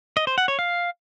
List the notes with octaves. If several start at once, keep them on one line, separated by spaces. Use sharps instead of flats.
D#5
C5
F#5
C#5
F5